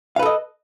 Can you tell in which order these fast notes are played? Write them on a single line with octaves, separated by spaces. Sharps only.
F5 B4 A4 D#5